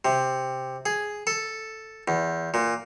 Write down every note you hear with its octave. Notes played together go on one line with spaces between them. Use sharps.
C3
G#4
A4
E2
A#2